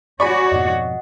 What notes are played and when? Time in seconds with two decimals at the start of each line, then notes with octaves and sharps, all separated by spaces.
0.20 F#4 C#5 D5 G#5 B5 C#6
0.52 F2 G#2 B2 D#5 F#5